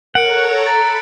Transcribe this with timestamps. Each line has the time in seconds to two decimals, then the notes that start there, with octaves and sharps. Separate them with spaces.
0.15 A4 A#4 C#5 F#5 A#5 F#6 C#7 D7
0.66 A4 A#5 B5 A6